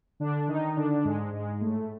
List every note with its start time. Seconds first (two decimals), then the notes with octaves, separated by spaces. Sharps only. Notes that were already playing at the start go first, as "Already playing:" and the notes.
0.20 D3 D4
0.48 D#3 D#4
0.76 D3 D4
1.04 G#2 G#3
1.33 G#2 G#3
1.61 A2 A3